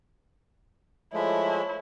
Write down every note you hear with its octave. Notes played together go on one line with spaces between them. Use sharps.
F3 G#3 A3 E4 C#5